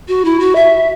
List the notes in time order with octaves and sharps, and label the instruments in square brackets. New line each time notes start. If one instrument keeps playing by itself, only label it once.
[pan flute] F#4
E4
F#4
E5